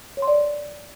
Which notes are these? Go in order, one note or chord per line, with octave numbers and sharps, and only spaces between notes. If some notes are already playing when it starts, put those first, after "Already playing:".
C#5
C6
D5